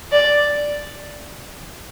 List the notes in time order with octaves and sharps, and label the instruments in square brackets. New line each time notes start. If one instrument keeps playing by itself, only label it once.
[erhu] D5